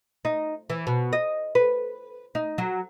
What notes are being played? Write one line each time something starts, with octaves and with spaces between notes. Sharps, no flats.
D#4
E3
B2
D#5
B4
D#4
F#3